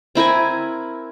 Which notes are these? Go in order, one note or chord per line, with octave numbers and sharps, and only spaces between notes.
C4 E4 A#4 G#5